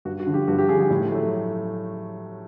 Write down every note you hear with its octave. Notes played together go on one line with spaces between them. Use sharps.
G2 F#4
F#4
D3 F3
G4
G2 F#4
G4
D3 F3 G#4
G#4
A2
F#3 A3